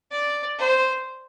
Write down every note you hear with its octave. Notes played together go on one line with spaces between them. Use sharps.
D5
C5